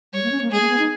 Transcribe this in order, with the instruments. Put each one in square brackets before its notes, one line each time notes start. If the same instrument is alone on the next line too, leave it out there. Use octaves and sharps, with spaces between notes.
[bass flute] G3 [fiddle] C#5
[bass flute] A#3
C#4
A#3
[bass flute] G#3 [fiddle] G#4
[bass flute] A#3
B3
D#4